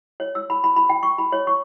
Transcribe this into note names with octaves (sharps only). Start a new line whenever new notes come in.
C#5
E6
B5
B5
B5
G5
C#6
B5
C#5
C#6